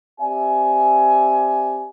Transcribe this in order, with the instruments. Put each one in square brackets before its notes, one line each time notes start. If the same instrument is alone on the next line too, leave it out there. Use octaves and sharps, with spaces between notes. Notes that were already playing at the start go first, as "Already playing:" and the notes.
[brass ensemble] C4 G4 D5 E5 G#5